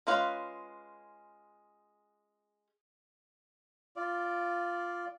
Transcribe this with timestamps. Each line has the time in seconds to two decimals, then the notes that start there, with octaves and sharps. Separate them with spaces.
0.07 G#3 C#4 F4 B4 F5
3.96 F4 D5